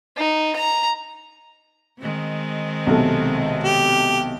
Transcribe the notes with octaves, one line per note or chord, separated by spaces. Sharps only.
D#4
A#5
D#3 G#3 C4
B1 C3 A4
G4